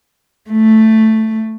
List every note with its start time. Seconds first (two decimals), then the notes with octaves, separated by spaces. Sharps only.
0.51 A3